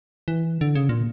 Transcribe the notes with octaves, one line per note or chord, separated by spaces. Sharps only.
E3
D3
C#3
A#2